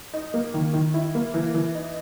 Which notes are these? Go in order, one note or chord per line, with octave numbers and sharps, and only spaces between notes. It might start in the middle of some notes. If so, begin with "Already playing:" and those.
D#4
A#3
D#3
D#3
E4
A#3
E3
E3
D#4